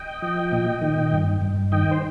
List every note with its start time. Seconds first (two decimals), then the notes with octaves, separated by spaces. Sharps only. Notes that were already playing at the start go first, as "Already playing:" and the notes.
Already playing: D#5 G5
0.22 F3
0.52 A#2
0.82 D#3
1.13 G2
1.42 G2
1.72 D#3 D#5 G5
1.91 C5